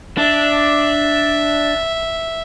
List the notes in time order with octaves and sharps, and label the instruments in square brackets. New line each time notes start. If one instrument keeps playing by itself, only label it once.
[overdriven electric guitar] D4 [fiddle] E5